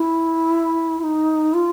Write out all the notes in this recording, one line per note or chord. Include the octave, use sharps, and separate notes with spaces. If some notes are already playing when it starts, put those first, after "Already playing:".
Already playing: E4
E4
D#4
F4